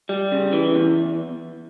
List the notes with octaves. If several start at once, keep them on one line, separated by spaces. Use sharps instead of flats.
G3
C#3
E3
E2